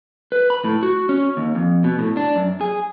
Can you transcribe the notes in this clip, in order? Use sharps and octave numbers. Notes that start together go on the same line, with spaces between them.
B4
B5
A2
F#4
C#4
D#2
F2
B2
A2
D4
F#2
G#4